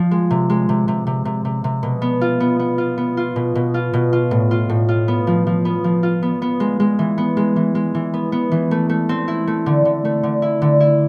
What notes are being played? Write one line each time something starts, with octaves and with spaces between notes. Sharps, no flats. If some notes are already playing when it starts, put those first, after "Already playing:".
Already playing: F3
G#3
C3
G#3
C3
C3
C3
C3
C3
C3
B2
B3
F4
B3
B3
F4
B3
F4
B2
B2
F4
B2
F4
A2
F4
A2
F4
B3
F3
F3
B3
F3
F4
B3
B3
G#3
G#3
E3
B3
G#3
E3
G#3
E3
B3
B3
E3
A3
A3
C4
E4
A3
D3
D3
A3
D3
E4
D3
E4